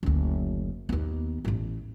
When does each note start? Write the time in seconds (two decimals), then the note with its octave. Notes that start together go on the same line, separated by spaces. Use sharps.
0.03 F#1 D2
0.89 D#2 B3
1.45 A1 A2